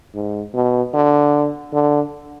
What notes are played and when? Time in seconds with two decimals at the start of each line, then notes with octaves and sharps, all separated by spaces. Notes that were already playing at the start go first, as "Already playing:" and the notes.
0.15 G#2
0.54 B2
0.94 D3
1.73 D3